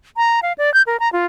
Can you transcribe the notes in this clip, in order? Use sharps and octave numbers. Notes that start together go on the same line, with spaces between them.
A#5
F5
D5
G6
A#4
A#5
F4